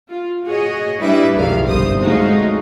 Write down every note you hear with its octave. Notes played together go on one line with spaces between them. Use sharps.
F4
F#4 G#4 C#5 D#5
G3 D4 E4 B4 E5
B1 F2 G#2 D#3 G3 F5
G1 C2 C5 D#6
G#3 A3 D#4 F4 F#4 C#5